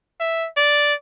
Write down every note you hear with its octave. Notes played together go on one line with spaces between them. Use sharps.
E5
D5